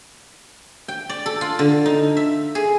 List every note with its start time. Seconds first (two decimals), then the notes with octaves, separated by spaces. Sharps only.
0.88 G5
1.09 D5
1.26 A4
1.41 F4
1.59 D3
1.86 D#4
2.17 E5
2.55 G#4